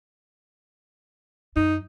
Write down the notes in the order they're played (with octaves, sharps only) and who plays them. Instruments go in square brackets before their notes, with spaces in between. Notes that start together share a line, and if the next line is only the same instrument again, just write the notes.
[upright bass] F#2 [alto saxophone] D#4